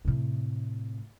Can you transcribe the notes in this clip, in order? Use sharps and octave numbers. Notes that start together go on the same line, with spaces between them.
A2 C3